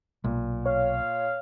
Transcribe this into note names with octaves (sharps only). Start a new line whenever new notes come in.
B1 A#2
C#5 F5